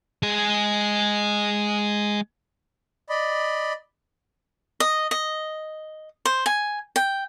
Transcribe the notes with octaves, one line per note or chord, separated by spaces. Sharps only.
G#3 G#4
D5 D#5 B5
D#5
D#5
C5
G#5
G5